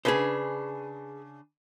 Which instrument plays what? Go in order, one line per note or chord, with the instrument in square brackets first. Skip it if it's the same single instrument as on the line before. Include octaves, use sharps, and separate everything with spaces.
[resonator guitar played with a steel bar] C#3 D4 [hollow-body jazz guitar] G#4 B4 C5